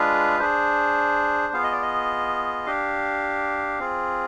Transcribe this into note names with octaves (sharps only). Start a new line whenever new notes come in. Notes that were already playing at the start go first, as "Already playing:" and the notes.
Already playing: G#3 D4 F4 G#4 B4
D4 G#4 C5
B3 F4 G#4 F5
D#5
D5
D#5
D4 G4 F5
C4 F4 G#4